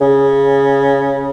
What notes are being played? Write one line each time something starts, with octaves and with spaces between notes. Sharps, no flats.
C#3